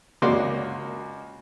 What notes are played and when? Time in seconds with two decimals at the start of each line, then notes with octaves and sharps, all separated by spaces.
0.22 C#2 A#3 F#4 D5 C6